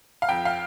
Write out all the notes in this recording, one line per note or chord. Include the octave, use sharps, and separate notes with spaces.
F5
F2 G5
F5